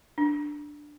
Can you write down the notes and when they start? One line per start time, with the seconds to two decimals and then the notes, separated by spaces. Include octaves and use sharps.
0.18 D4